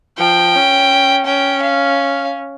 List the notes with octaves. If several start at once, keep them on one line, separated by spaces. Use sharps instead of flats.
F3 G5
C#4
C#4 G5
F5